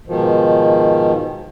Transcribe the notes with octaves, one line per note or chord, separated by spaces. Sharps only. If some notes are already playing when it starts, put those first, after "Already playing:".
G#2 B2 D#3 F3